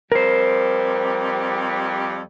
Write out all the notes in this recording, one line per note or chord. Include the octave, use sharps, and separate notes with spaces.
F2 G3 A#4 C5